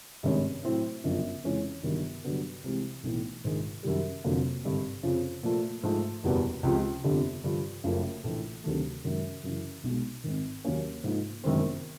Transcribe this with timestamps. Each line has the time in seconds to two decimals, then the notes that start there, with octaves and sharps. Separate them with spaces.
0.23 G#1 G2 D#3 G#3 C#4
0.63 A2 F#3 A3 C4 E4
1.04 G1 F#2 C#3 F3
1.43 F2 C#3 E3 G#3 C#4
1.83 G1 G2 D#3 F#3
2.24 G2 D3 F#3 B3 D4
2.64 C2 C3 E3 G#3
3.04 B1 A2 E3
3.44 A#1 G#2 D#3 G#3
3.83 F#2 D#3 G3
4.24 F1 F2 D3 F#3 A#3
4.64 G#1 G2 D3
5.03 F2 C#3 F3
5.43 A#2 F3 A3
5.83 G#2 F3 A3
6.24 F#1 E2 B2 G3 B3
6.63 C#2 C3 F3 G#3
7.04 G1 F2 D3 G3
7.44 G2 D3 F3
7.84 F#1 F#2 C#3 F3 A3
8.24 A#1 A2 E3 A3
8.64 D2 C3 D#3 F#3 A3
9.04 F#2 D#3 G#3
9.44 F#2 C#3 E3
9.84 B1 B2 G#3
10.24 G#1 G#2 D#3
10.65 D#2 D#3 F#3 A#3 C#4
11.04 G#2 F3 A#3 D#4
11.44 G1 F#2 D#3 G#3 C4